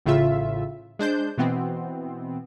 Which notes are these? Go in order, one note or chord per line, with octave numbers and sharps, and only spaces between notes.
A1 A2 C#3 F4 E5
G#3 D4 C5 G6
B2 E3 B3 C4